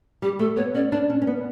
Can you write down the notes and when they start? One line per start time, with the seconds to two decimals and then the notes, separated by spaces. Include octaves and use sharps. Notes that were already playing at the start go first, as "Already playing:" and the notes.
0.22 G3 G4
0.39 A3 A4
0.57 B3 C#5
0.74 C#4 D5
0.92 D4 D5
1.10 C#4
1.22 C#4
1.27 B3